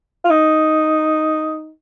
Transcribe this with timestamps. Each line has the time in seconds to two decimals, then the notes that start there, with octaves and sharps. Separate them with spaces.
0.25 F4
0.30 D#4